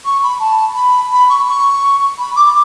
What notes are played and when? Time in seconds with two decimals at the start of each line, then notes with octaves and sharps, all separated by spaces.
0.05 C#6
0.23 B5
0.40 A5
0.75 B5
1.11 B5
1.29 C#6
1.47 C#6
2.18 B5
2.36 D6